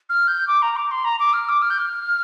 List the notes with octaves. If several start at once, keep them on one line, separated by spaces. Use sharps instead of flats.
F6
G6
D6
A#5
D6
C6
A#5
D6
F6
D6
F6
G6
F6